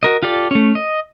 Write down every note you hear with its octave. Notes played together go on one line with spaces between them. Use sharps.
F#4 A#4 D#5
F4 G4 A4 D5
A3 C#4
D#5